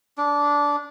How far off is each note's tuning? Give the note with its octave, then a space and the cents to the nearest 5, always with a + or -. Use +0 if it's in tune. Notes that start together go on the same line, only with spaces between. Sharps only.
D4 -15